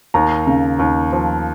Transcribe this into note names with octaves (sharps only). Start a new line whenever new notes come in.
D#2 A#5
C#3
D#2
F3